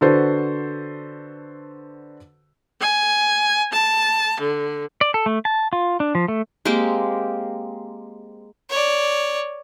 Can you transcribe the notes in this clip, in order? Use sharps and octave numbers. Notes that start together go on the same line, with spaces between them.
D3 F#4 A4 B4 C5
G#5
A5
D3
D5
A4
A3
A5
F4
D4
F3
A3
G#3 A#3 C4 G4
C#5 D5